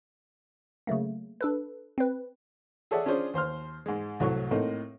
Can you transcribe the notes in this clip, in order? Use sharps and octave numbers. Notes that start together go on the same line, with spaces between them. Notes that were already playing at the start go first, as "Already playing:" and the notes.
C#3 F#3 A3 A#3
D4 A4 B4
C4 B4
G#4 A4 C#5 D5 E5 F#5
C#4 D4 F4 G#4 C5 C#5
D#2 C5 C6 F6
G#2 G#3
C2 A2 F#3 A3 C#6
A2 A3 A#3 C4 D#4